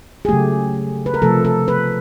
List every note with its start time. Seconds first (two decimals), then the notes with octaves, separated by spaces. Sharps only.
0.25 G#4
0.28 C#3 F#3 A3 G4
1.06 B4
1.14 A#4
1.21 C3 F3 A3 A4
1.45 A4
1.68 B4